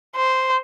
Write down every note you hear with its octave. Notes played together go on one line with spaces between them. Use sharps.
C5